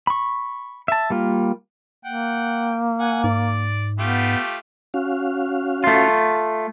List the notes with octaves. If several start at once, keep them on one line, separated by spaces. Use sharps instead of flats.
B5 C#6
E5 A5
G3 A#3 F4
A#3 F#5 G5
F#5 G#5
G#2 D5
A3 B3 F4 G4
C#4 F#4 F5
A3 F4